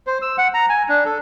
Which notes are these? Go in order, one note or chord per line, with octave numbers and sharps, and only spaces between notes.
C5
E6
F#5
A#5
G#5
D4
A4